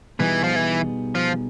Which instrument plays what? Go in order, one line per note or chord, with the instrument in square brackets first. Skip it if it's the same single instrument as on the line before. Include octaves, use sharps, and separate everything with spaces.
[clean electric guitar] B2 G3 B3 D#4 G#4 [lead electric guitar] E3
[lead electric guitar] F3
E3
F3